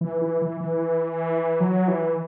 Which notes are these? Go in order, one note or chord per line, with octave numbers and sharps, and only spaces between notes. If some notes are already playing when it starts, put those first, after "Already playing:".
E3
E3
E3
E3
F#3
E3